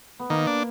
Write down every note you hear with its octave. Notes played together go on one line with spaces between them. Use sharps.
B3
D#3 A#3
D4